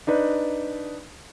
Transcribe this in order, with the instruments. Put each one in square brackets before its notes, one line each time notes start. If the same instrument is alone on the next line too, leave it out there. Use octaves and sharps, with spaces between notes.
[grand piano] D4 D#4 B4